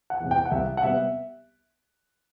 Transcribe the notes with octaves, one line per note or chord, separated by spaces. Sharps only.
F#5
E2 C3
G5
F#5
C2 E5
F#5
C3 G3 B3 E5